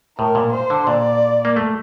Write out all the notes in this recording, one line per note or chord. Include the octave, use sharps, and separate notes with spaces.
A2 A#4
A#2
C5
D3
A#2 D5
A#3
A3